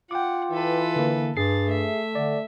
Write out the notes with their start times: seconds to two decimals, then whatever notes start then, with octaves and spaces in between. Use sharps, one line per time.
0.11 F4 F#5 G5 D6
0.51 E3 A4 B4
0.96 D3 A#3
1.37 G2 G#4 A6 C7
1.68 A3 E5
2.15 D3 D5